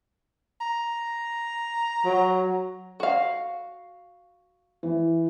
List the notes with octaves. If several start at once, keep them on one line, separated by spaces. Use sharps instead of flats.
A#5
F#3
F#4 F5
E3